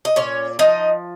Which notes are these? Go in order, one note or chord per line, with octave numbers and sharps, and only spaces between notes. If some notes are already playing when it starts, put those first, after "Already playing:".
D#5
A#2 C#4 C#5
F3 D#4 D#5